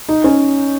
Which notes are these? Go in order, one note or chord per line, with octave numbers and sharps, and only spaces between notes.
D#4
C#4